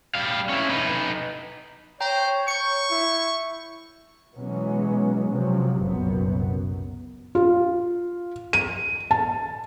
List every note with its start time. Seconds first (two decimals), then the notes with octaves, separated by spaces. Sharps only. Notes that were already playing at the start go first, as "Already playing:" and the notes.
0.15 G3 F5
0.49 C#4 E4
0.69 D#4 B4
2.01 C5 C#5 G5 A#5
2.48 C#6 G6 C#7
2.90 E4
4.35 B2 E3 F#3 G#3 B3 C#4
5.29 C3 F3 F#3
5.80 F#1 C2 F#2 A#2 B3
7.35 F4
8.53 D#7
9.11 A5